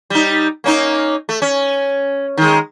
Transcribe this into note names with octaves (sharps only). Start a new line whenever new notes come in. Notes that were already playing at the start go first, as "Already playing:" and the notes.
G3 D#4
A#3 C#4 D#4
A3
C#4
D#3 G#3